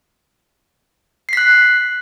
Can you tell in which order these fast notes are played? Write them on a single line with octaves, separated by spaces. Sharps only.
C7 B6 F#6